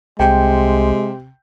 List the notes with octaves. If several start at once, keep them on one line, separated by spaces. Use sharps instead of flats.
C2 C3 G#3 G5